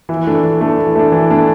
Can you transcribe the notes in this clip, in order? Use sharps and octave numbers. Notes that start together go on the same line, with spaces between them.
E3
A3 D4
E3
A3 D4
E3
A3 D4
E3
A3 D4